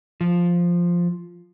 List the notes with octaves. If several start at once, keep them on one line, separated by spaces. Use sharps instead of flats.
F3